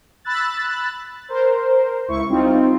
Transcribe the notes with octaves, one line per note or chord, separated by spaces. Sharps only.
B5 E6 F#6 A6
A#4 C5
C#2 E4 C#6
G3 C4 D#4 F4